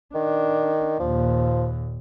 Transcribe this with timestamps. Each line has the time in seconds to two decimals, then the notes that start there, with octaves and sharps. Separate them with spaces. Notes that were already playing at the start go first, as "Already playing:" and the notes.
0.14 D#3 D4
1.00 D#2 A#2 F3